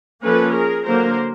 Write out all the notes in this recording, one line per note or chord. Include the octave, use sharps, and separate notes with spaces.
F3 A#3 C#4 A4 B4
G#4 A#4
D3 F#3 A#3 A#4 C5